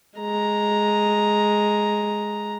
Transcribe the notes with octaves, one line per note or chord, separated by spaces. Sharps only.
G#3 A#5